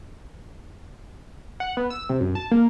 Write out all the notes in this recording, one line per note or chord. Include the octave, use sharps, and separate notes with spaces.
F#5
B3
E6
C3
F#2
A5
A#3